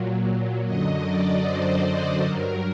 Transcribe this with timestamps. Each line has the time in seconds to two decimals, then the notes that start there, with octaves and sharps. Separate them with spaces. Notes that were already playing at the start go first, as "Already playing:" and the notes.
Already playing: A#2 F#3
0.65 F#2 D3 F#3 D#5
1.06 D5
1.44 C5
2.25 G2 F#3 A#4